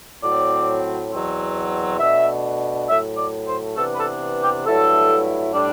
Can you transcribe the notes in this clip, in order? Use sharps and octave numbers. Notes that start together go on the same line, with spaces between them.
A2 F#3 C4 D5
E2 B2 F#3 C4
B2 A3 D4 E5
A2 F#3 A3 E5
D5
C5
C3 E3 B3 D4 A4
B4
A4
G4
G2 F#3 A3 E4 A4
A2 G3 D4